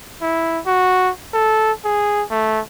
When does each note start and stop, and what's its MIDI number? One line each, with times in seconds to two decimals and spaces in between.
0.21 0.60 64
0.66 1.10 66
1.33 1.72 69
1.84 2.23 68
2.30 2.60 57